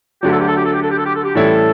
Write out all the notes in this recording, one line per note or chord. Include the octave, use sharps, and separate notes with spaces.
D2 D3 F#3 G4
A4
G4
A4
G4
A4
G4
A4
G4
A4
G4
A4
G4
A2 E3 G3 C#4 E4 A4